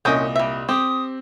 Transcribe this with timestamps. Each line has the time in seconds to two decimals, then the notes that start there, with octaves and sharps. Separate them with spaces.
0.05 C2 A#2 C#4 D#5 G5
0.36 G3 E5
0.69 C4 G4 D#6